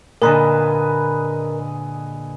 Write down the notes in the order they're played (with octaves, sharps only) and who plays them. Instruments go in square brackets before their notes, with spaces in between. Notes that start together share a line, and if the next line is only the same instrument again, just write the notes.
[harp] A#2 D3 [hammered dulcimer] G#4 B4 D#5 [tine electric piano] A#4 A#5 B5